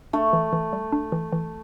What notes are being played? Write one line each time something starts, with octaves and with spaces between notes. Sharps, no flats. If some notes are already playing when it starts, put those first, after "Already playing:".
A3 D4
E3
E3
G3
D4
E3
E3